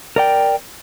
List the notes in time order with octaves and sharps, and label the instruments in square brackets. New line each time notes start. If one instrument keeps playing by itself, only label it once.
[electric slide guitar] A#4 D5 G5